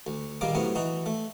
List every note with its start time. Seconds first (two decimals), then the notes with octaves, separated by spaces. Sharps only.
0.07 D2
0.41 A#1 D#3 G3 A#3 D6
0.55 A2 C3 F#3 B3
0.75 E3 D#4 F#4
1.06 A3